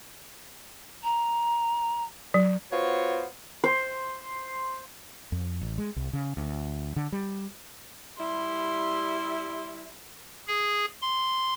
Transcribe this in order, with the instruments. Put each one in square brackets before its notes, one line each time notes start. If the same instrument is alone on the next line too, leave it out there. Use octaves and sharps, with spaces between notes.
[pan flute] A#5
[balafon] F#3
[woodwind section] B3 F4 F#4 C5 C#5 F#5
[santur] C5
[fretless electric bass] F2
A1
G#3
C2
C#3
D2
D3
G3
[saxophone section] G3 E4 [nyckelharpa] C6
[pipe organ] G#4
C6